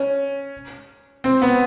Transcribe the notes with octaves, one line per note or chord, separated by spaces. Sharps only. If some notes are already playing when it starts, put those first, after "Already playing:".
Already playing: C#4
C4
B3